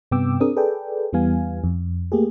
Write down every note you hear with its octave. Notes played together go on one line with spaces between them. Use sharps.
G2 C3 B3 G5 D6 E6
C4 D4 G#4 A#4 D#6
G#4 A4 B4 D5 G5
E2 E3 G3 B3 F5 G#5
F2
A3 A#3 G4 G#4